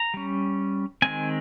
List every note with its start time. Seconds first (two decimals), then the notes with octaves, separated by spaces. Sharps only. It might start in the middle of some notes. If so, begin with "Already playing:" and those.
Already playing: A#5
0.14 G3 C#4
1.02 D#3 G#3 C4 G#5